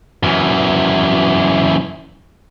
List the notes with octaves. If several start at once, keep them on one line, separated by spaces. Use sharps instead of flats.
F#2 E3